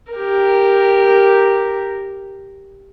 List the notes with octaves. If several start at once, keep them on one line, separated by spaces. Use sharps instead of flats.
G4 A#4